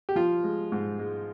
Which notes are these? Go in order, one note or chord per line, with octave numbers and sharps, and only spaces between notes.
G4
F3 F4
G#3
G#2
G#3